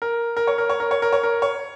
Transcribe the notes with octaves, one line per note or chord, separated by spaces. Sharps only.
A#4
A#4
C#5
A#4
C#5
A#4
C#5
A#4
C#5
A#4
C#5